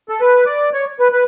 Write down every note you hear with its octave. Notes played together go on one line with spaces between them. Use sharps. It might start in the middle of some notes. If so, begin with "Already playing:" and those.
A4
B4
D5
C#5
B4
B4